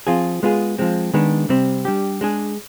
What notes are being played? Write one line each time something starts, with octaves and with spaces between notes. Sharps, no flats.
F3 C4 F4 G#4
G#3 B3 F4 G#4
F3 G#3 C4
D#3 G#3 B3 D4
C3 G3 C4
G3 D4 G4
G#3 D4 G#4